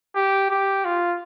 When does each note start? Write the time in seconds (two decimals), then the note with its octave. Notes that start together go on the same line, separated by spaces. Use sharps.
0.16 G4
0.50 G4
0.85 F4